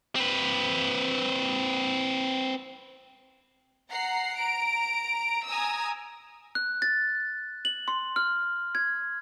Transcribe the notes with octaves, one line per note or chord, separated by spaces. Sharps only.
C4 B4
F#5 A#5 C7
A#5 D7
G#5 A#5 D#6 E6
F#6
A6
F#7
C6
F6
G#6